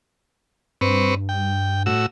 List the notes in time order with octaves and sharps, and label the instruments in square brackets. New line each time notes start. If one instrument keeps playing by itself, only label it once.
[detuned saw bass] G2 [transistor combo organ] C4 B4 C#6
[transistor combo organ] G5
A2 F#4 E6